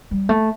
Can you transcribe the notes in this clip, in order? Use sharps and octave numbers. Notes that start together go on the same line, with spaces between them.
G3
A3